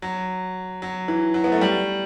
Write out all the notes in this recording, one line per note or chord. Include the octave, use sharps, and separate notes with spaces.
F#3
F#3
E3
F#3
B3
A3
G3